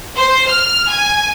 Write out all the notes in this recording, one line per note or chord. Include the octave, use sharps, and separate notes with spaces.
C5
F6
G#5